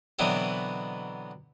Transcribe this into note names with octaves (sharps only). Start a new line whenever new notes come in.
B2 D3 E3 F#3 B3 C4